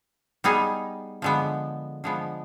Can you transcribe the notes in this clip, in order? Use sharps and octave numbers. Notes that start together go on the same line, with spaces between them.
G3 B3 D#4 G#4
D3 F3 G#3 B3
D3 F3 G#3 B3